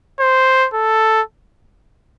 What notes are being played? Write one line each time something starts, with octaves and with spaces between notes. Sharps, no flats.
C5
A4